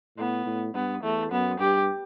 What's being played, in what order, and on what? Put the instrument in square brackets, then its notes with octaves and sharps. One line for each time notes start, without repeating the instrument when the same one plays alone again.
[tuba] A2 [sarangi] B3
[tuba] A2
[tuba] G2 [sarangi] B3
[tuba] E2 [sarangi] A3
[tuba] F#2 [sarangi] B3
[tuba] G2 [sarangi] G4